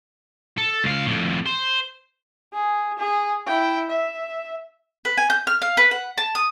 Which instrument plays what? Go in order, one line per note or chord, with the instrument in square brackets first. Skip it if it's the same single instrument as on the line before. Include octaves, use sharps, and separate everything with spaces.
[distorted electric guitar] A4
C#2 F5
F2 A2
C5
[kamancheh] G#4
G#4
E4 G5
E5
[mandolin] B4
G#5
G6
F6
F5
B4
F#5
A5
D#6